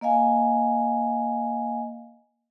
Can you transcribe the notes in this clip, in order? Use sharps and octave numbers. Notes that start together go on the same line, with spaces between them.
A#3 D#5 F5 G#5